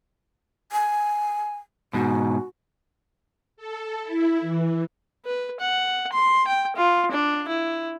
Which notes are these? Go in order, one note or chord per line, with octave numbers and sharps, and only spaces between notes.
G#5
G#2 B2 F#4
A4
E4
E3
B4
F#5
C6
G5
F4
D4
E4